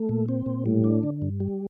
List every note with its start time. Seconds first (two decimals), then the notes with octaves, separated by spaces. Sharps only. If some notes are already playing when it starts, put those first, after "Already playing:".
Already playing: A3
0.09 A#2
0.29 C4
0.46 A#2
0.66 A2 G3
0.84 D4
1.03 D3
1.22 G2
1.40 G3